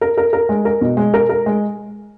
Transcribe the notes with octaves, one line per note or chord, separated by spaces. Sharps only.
A#4
A#4
A#4
G#3
A#4
B2
G#3
A#4
A#4
G#3